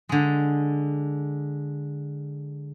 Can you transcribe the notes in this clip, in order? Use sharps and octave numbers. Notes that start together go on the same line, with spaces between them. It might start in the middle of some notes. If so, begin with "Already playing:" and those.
D3 G#3